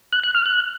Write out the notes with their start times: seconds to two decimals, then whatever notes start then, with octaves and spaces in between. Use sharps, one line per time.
0.13 F#6
0.24 F#6
0.35 F6
0.46 F#6